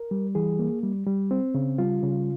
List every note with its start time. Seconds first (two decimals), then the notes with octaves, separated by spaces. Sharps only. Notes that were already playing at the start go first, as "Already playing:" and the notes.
Already playing: A#4
0.11 G3
0.35 E3 G#4
0.59 A#3
0.83 G3
1.07 G3
1.31 C4
1.55 C#3
1.78 G3 F4
2.03 C#3